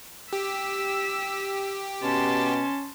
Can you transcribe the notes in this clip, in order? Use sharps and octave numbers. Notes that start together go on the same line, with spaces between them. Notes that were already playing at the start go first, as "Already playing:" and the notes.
G4 E6 B6
B2 C#4 A5 C6